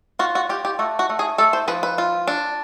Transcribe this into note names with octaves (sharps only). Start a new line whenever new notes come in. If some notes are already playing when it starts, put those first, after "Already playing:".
F4 F#4
F#4
F4 G4
G4
A3 F#4
F#4
A3
G#4
A3 A4
C5
F3 B4
B4
F4
D4